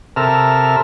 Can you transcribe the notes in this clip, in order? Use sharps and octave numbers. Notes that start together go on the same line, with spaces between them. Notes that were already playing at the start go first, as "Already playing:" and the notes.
C3 A4 A#4 E5 F6